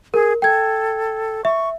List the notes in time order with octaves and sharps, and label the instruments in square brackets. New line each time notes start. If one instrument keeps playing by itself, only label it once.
[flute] G#4 [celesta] A#4
[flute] A4 [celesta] G5 G#6
[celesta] E5 [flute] C#6